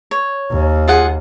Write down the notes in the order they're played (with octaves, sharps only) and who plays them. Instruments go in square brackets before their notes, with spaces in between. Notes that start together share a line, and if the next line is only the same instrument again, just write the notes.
[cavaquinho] C#5
[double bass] D#2
[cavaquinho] F4 G#4 F#5